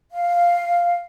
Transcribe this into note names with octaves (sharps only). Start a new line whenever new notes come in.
F5